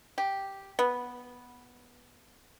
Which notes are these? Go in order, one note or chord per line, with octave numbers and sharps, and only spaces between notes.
G4
B3